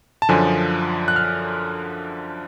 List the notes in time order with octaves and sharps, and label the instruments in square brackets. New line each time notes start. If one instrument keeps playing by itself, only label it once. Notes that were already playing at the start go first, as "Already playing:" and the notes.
[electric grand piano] A5
F#2 D3 F3 G#5
F#6
F6